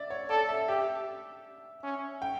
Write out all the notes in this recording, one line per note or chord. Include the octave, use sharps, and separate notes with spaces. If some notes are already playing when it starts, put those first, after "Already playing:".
Already playing: D5 E5
C#5
A4 D5
E5
G4 E5
C#4
G5